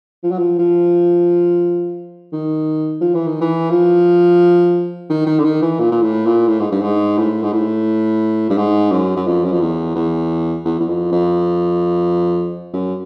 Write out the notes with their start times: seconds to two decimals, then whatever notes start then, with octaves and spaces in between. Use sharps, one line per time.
0.23 F3
0.31 F#3
0.38 F3
0.58 F3
2.33 D#3
3.01 F3
3.14 E3
3.27 D#3
3.41 E3
3.70 F3
5.10 D#3
5.26 D#3
5.39 D3
5.44 D#3
5.62 E3
5.79 A#2
5.91 A#2
6.02 A2
6.26 A#2
6.48 A2
6.60 G#2
6.71 G2
6.82 G#2
7.18 A2
7.43 G#2
7.52 A2
8.50 G2
8.57 G#2
8.91 F#2
9.16 F#2
9.27 F2
9.44 F#2
9.53 F2
9.61 E2
9.95 E2
10.65 E2
10.80 E2
10.87 F2
11.12 F2
12.73 F#2